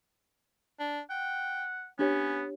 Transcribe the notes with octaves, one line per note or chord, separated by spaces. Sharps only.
D4
F#5 G5
B3 C#4 D4 G4 C#5